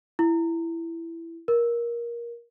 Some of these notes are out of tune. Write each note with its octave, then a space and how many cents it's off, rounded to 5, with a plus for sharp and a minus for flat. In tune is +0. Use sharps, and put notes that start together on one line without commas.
E4 +10
A#4 +20